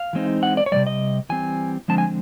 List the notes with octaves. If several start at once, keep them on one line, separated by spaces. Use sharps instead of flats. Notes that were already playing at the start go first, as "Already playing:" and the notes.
Already playing: F5
E3 G#3 C4 D#4
F#5
D5
C#5
C3 D#3 G3 D5
D#5
E3 G3 C4 G#5
D3 F3 G#3 C4 A5
G#5